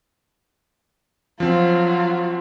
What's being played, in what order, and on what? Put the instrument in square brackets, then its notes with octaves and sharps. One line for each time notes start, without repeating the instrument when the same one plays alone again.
[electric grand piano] F3 C4 [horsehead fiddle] F#3 F4